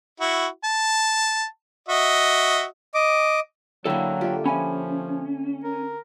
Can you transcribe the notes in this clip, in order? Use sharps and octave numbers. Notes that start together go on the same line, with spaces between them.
E4 F#4
A5
F#4 D#5 E5
D#5 D6
D3 F#3 A#3 E4 A4 G5
F4 G4 E5
F3 C#4 E5 G#5 B5
A#4